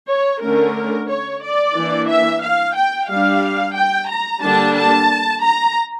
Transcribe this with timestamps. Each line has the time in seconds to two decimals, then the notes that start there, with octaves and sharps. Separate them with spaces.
0.09 C#5
0.42 D3 A3 C#4 A#4
1.09 C#5
1.42 D5
1.76 E3 A#3 D4
2.09 E5
2.42 F5
2.75 G5
3.09 G3 D4 F5
3.76 G5
4.09 A#5
4.42 D3 G3 A#3 D4 A5
4.76 A5
5.42 A#5